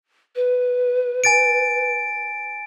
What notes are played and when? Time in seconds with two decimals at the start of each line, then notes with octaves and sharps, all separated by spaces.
0.36 B4
1.24 G#5 A6 D7